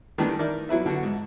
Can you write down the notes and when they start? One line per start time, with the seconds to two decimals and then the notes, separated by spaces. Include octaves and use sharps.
0.18 D#3 E3 G3 A3 B3 D4
0.39 D#4 E4 A#4 D5
0.69 F#3 E4 B4 E5
0.86 D3 B3 F#4
1.03 G#2